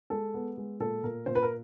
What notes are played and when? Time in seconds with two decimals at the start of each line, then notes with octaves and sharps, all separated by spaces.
0.10 G#3 A4
0.34 B3
0.57 G#3
0.80 A#2 A4
1.03 A#2 A#4
1.26 A#2 C5
1.35 B4
1.43 A#4